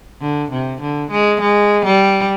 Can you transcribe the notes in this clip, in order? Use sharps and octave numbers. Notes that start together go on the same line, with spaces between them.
D3
C3
D3
G#3
G#3
G3